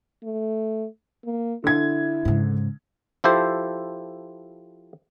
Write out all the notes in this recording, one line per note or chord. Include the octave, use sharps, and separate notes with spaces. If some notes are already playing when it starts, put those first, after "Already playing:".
A3
A#3
D3 E4 G#6
G#2 C#3
F3 E4 G4 A4 C5